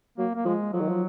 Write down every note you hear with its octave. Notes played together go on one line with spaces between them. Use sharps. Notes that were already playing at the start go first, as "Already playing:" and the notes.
F#3 A#3
A#3
F3 G#3
F3 F#3
D#3
F3